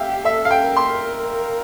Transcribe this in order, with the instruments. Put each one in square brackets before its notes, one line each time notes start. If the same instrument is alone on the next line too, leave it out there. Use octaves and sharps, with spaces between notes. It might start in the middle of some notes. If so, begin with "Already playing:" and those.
Already playing: [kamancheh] G4 [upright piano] E5 F5
[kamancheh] A4 [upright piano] E5
[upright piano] F5
G5
[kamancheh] A#4
[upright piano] C6